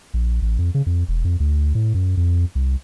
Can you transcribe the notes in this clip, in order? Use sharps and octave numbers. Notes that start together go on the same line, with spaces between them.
A#1
A1
F2
C#3
F2
E1
F2
D2
A2
F#2
F2
C2